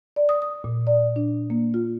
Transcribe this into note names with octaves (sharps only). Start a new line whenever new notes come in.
D5
D#6
D#6
A#2
D5
D4
A#3
F4